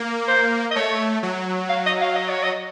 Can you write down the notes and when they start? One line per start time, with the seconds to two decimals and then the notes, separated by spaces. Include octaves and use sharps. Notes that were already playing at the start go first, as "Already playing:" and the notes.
Already playing: A#3
0.27 C5
0.71 D#5
0.76 A3 C#5
1.23 F#3
1.69 F5
1.86 D#5
2.01 F5
2.15 D#5
2.29 C#5
2.43 D#5